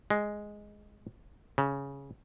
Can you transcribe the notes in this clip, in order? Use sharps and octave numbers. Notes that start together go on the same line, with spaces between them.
G#3
C#3